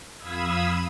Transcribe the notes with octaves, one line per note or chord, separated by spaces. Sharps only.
F2 F5 B5 D#6 E6 G#6